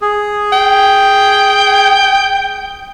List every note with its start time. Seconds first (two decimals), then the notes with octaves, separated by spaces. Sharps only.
0.02 G#4
0.52 G5